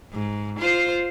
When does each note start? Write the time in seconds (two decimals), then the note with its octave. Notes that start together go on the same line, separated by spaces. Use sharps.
0.12 G#2
0.59 F4 C5